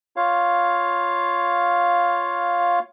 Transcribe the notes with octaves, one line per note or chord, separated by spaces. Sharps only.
F4 C#5 F5